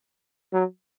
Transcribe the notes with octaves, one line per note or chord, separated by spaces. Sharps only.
F#3